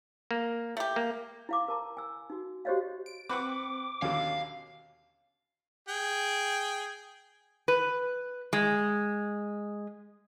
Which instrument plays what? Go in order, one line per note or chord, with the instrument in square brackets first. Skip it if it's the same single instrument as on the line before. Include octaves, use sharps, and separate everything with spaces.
[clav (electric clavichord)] A#3
[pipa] A3 G4
[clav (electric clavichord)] A#3
[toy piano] E4 F5 D6
A#4 A5 A#5
G#5 E6
D#4 F#4
F#4 G4 C5 C#5 D#5 F5
[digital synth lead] D7
[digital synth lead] C4 [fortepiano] B4 F#5 C#6 [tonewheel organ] D6
[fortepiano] D#2 B2 D3 [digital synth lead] C#4 [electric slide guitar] F5
[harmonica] G#4 G5
[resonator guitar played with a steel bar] B4
G#3